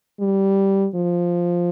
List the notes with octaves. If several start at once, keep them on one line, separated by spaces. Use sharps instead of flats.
G3
F3